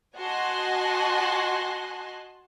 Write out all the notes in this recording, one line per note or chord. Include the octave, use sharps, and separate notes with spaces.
F#4 D#5 G#5 A5 C6 F#6